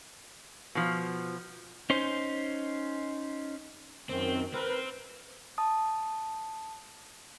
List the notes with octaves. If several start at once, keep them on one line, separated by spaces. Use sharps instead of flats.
B2 F3
C#4 D#4 C5
F#2 D#3 C4
C4 A#4 B4
A5 D#6